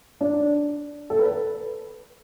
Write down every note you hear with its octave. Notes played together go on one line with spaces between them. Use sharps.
D4
A4
B4